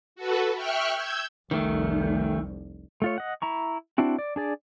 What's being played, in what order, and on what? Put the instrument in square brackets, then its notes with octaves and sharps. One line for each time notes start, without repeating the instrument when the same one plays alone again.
[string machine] F#4 A4 B4
E5 G5 C#6 F6 F#6
E6 G6 G#6
[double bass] F1 C2 [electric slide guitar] D#3 A3
[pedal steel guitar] A3 F4 C#5
D#5 F#5
E4 A#5 C#6
C4 D4 E4 F#4
D5
D4 G#4 D5